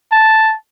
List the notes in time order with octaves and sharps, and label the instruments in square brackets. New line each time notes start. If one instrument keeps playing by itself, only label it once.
[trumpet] A5